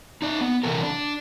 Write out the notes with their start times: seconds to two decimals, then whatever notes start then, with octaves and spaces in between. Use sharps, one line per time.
0.22 D#4 D5
0.41 B3
0.63 C3 E3 A4 A#4
0.83 D4